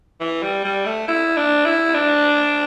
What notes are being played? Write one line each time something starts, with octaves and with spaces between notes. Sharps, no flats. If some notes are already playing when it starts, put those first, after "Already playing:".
E3
G3
G3
A3
E4
D4
E4
D4